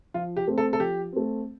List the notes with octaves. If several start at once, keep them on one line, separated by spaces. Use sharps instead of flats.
F3 F4
G4
A3 C4
A4
A4
F3 G4
A3 C4